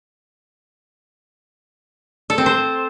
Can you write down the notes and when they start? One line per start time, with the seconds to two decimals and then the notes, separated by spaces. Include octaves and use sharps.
2.30 A4
2.38 C4
2.46 C5